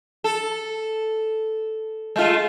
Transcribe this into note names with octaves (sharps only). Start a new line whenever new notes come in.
A4
G#3 A3 F4